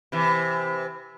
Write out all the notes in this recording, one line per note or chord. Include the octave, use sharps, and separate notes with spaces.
C3 E3